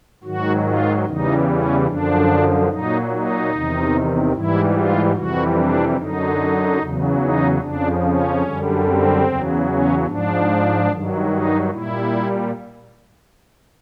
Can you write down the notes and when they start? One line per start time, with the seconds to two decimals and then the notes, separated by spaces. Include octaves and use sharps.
0.24 G#2 D#3 F#3 F#4
0.64 F4
1.05 E2 C#3 E3 G3 D#4
1.46 C#4
1.87 F#2 D3 F3 D4
2.68 A#2 F#3 D#4
3.10 D#4
3.51 E2 C3 D#3
4.32 G#2 E3 G3 E4
4.73 F4
5.15 F2 C3 E3 G3 F#4
5.56 D4
5.97 F#2 D3 F#3 D#4
6.78 E2 C#3 F#3
7.19 D#4
7.60 F2 C#3 F3 D4
8.02 C#4
8.42 F#2 D3 G3
8.84 C4
9.25 E2 C#3 F#3
9.66 C#4
10.06 G#2 F3 D4
10.89 G2 D#3 F#3
11.28 D#4
11.70 A#2 G3 E4